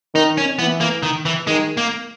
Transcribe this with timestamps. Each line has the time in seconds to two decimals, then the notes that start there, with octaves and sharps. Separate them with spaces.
0.15 D#3 D#4
0.38 C#4
0.59 E3 B3
0.81 A#3
1.03 D#3
1.25 E3
1.47 D#3 G#3
1.77 A#3